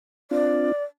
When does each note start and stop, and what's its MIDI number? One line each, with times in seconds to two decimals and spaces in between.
0.31 0.72 60
0.31 0.72 62
0.31 0.72 65
0.31 0.83 74